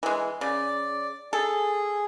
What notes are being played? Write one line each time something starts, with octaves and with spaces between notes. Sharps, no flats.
E3 G#3
C#3 D5
G#4 A4